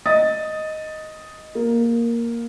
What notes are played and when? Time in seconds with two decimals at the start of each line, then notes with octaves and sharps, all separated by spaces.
0.06 D#5 D#6 A6
1.55 A#3